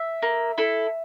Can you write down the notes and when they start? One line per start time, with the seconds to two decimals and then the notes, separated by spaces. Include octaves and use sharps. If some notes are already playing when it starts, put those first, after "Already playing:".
Already playing: E5
0.22 A#3
0.58 E4 A4